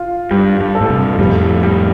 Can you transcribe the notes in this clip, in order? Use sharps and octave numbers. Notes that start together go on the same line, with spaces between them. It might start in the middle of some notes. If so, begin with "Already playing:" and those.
Already playing: F4
G2 G3
G2
A4
A2
G2 C3
F2 A2 G3
G3